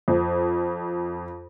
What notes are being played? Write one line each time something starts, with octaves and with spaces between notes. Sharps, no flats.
F2